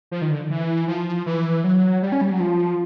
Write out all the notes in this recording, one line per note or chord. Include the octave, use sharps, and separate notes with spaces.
F3
D#3
D3
E3
F3
E3
F#3
G3
C#4
G3
F#3
F3